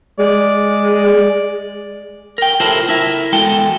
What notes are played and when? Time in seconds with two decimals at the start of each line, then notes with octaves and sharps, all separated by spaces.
0.19 G#3 D5
2.38 A#4 G5
2.60 E4 F4 G4 A4 A#4 C5
2.89 E4 A#4 E5
3.33 E2 G#3 F#4 A4 G5